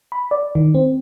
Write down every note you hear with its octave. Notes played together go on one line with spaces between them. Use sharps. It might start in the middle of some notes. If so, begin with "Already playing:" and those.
B5
D5
D#3
C4